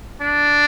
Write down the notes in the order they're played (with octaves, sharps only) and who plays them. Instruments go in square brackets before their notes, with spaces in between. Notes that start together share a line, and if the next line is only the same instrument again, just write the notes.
[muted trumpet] D4